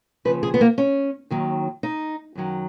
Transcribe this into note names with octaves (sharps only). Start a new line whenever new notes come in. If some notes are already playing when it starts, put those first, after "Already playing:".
D#2 C#3 F3 B4
G#4
B3
A#3
C#4
D#2 D#3 F#3
D#4
F#2 D#3 F#3